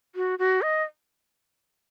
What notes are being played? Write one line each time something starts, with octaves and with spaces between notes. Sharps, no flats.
F#4
F#4
D#5